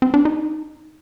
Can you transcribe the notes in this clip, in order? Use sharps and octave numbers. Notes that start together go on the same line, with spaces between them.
C4
D4
D#4